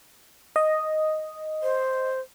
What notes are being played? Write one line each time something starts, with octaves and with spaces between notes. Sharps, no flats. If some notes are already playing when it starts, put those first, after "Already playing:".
D#5
C5